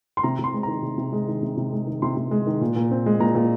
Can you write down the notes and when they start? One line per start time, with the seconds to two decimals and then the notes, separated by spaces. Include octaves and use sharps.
0.17 C6
0.23 C3 A#5
0.39 C3
0.44 C6
0.54 G#3
0.63 D#3 A#5
0.83 C3
0.98 C3
1.13 G#3
1.28 D#3
1.43 C3
1.57 C3
1.73 G#3
1.87 D#3
2.02 C3 C6
2.17 C3
2.31 G#3
2.47 D#3
2.61 A#2
2.76 A#2
2.91 C4
3.06 G#3
3.20 A#2 A#5
3.35 A#2